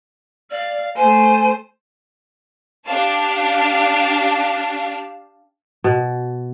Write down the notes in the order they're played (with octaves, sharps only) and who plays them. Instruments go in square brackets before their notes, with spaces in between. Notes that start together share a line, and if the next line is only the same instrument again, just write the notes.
[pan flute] D5 [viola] F5
[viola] A3 C5 [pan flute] G#5
[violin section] D4 G4 F5 A5
[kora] B2